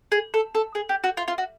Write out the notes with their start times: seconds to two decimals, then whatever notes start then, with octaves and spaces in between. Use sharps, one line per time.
0.12 G#4
0.34 A4
0.55 A4
0.75 G#4
0.89 G4
1.04 F#4
1.17 F4
1.28 F4
1.38 F#4